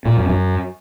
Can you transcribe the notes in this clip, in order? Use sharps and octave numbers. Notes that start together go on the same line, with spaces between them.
A#2
F#2
F#2